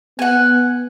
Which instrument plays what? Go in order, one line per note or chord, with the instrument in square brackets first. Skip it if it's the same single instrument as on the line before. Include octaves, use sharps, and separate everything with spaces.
[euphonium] B3 [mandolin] F#5 G#5